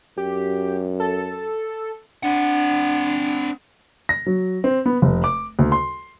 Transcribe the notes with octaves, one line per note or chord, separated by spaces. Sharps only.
F#2 G4
A4
C4 D4 F#5
A#6
F#3
C4
B3
F1
D6
D2
C6